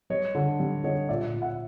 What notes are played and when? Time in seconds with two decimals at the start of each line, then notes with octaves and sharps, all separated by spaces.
0.10 G3 C#5 D#5
0.35 D3
0.60 G3
0.84 D3 C#5 D#5
1.09 A#2 D5 E5
1.33 A#2
1.42 E5 F#5